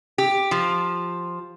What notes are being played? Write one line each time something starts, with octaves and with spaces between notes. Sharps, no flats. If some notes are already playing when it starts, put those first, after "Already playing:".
G4
F3